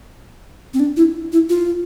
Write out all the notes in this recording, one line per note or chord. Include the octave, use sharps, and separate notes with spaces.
C4
D4
E4
E4
F4